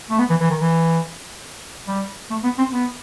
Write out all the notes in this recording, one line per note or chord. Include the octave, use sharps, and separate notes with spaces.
A3
B3
E3
E3
D#3
E3
G3
A3
B3
C4
B3